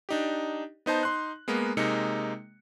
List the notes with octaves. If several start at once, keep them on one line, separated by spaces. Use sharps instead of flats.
D4 D#4 G4
B3 D#4 C5 A5
D#4 C6 F#6
G#3 A#3 B3
C3 G#3 A#3 D#4 C#7